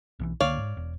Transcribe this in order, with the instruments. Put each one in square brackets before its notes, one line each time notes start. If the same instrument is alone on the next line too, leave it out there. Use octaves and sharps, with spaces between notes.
[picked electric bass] B1 D#3 E3
[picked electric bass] C#2 D3 A#3 [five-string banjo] C#5 D5 F5
[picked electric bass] G#2
E1